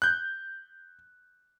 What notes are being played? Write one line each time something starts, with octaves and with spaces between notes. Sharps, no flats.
F#6 G6